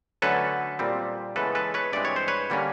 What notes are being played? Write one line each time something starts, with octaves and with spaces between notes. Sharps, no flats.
D3 F#3 A3 C#4 A4 B4
A#2 G3 C4
C#3 E3 G#3 B3 A4 B4
A4 B4
B4 C#5
G2 E3 G#3 C4 D5
C#5
C5
B4 C#5
D3 G3 A#3 C#4